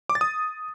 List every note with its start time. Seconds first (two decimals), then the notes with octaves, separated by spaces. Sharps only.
0.09 D6
0.15 A6
0.21 D#6